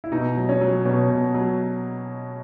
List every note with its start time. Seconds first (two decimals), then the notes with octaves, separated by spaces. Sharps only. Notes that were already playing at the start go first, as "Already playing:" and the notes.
0.04 E4
0.12 B2 D#4
0.37 F#3
0.49 C#4
0.61 F#3
0.85 B2 C#4
1.10 B2
1.34 F#3